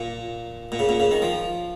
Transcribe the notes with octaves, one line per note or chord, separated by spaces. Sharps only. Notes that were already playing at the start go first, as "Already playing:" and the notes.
Already playing: A#2
A#2
C#3
A#2
C#3
D#3
F3